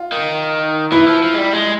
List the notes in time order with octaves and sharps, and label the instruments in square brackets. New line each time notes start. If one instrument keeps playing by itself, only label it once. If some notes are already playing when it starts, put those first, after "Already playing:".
Already playing: [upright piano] F4
[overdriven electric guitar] D#3
[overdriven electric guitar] E3 [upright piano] E4
[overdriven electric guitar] F3
F3
G#3
G3
G#3